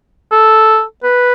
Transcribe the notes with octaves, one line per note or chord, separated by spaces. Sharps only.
A4
B4